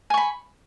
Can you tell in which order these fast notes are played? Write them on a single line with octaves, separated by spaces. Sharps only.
G#5 C#6 B5